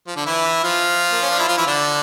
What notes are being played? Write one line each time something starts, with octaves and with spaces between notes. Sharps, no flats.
F3
D3 D4
E3 E4
F3 F4
A#3
C#4
D4
E4
F3 F4
E3 E4
D3 D4